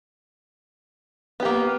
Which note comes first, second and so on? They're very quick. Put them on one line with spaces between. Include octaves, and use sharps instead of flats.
B3 G4 A#3